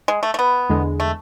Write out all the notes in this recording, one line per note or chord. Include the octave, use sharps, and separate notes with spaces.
G#3
A3
A3
B3
E2 D3 G#3
A3